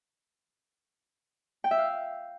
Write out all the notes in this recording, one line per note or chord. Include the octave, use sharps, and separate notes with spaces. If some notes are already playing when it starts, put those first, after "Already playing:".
G5
E5
F5